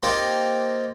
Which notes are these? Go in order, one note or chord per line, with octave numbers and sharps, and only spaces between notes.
A#3 C4 D#4 F4 G4